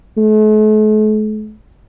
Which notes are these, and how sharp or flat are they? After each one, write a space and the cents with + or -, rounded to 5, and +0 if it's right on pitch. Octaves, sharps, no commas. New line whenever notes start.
A3 -45